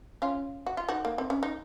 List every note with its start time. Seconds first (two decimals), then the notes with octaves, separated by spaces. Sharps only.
0.22 C#4 F4
0.66 F#4
0.77 F4
0.88 D#4 F#4
1.05 A#3
1.18 C4
1.30 C#4
1.43 D#4